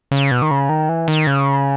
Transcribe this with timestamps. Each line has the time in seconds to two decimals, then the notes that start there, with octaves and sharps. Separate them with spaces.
0.11 C#3
0.31 B2
0.42 D#3
0.51 C#3
0.69 D#3
0.89 E3
1.08 D#3
1.27 C#3